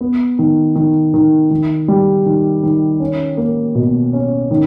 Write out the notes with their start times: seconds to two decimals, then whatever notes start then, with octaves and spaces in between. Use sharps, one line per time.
0.01 B3
0.39 D#3
0.75 D#3
1.14 D#3
1.51 D#3
1.88 G3
2.26 D#3
2.63 D#3
3.00 C#4
3.37 A#3
3.75 B2
4.13 C#4
4.51 D#3